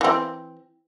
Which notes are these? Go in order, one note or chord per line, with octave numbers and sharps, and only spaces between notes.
E3 C4